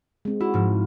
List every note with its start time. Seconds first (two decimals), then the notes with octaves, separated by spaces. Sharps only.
0.25 G#3 C4
0.41 E4 F#4
0.54 G#2 F3